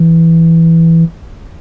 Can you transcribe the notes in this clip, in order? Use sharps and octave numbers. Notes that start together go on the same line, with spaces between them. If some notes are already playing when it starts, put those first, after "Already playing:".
Already playing: E3